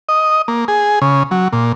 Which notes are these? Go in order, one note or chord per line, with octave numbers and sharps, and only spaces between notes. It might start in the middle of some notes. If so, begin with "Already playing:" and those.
D#5
A#3
G#4
C#3
F#3
A#2